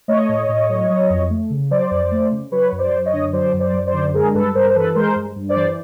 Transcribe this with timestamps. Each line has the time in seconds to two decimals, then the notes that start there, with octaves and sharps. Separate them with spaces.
0.08 A3 C#5 D#5
0.29 A2
0.49 A2
0.69 F#3
0.90 F#3
1.10 F2
1.30 A3
1.50 C#3
1.71 F#3 C5 D5
1.91 F2
2.11 A3
2.32 C#3
2.52 F#3 B4 C#5
2.72 F#2
2.79 C5 D5
2.93 F#2
3.06 C#5 D#5
3.13 D3
3.33 F#3 C5 D5
3.53 F#2
3.60 C5 D5
3.73 F#2
3.87 C5 D5
3.93 D3
4.14 G#3 G#4 A#4
4.34 G2 A4 B4
4.55 G2 A#4 C5
4.70 C5
4.75 E3 A4 B4
4.95 G#3 A#4 C5
5.16 G2
5.36 G2
5.49 C5 D5
5.56 E3